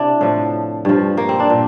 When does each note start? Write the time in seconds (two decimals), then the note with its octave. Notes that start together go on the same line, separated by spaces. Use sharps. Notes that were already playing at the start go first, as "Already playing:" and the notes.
Already playing: C3 D4 E4
0.21 A2 F3
0.85 G2 F3
1.17 A#3
1.29 C4
1.40 D4
1.50 A#2